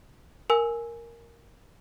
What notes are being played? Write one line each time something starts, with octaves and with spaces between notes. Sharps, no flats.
A#4 G#5 E6